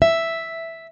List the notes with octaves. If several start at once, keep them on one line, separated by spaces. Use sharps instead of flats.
E5